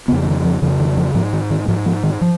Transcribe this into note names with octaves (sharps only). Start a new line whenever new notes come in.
F2 C#3 B3
D#3
F3
F2 C#3 F3
D#3
F3
G#2 F3
D#3
D#3
G#2 F3
F3
D#3
F3